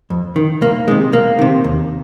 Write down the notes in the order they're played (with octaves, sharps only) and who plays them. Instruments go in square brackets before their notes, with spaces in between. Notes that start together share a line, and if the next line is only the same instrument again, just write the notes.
[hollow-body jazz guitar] F2
D#3
C2 A#3
D#3 G#3
C3
C2 A#3
C3 D#3
D#2